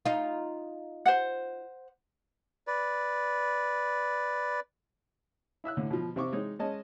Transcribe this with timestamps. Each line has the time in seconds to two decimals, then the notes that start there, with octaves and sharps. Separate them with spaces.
0.06 D#4 F4
1.06 C5 F#5
2.67 B4 D5
5.64 E4 E5 E6 F#6
5.77 A2 D3
5.91 B2 F3
6.16 C3 C4 C#6 D6
6.33 G#3 D#4 C#5
6.59 G#3 C#4 D#5 A5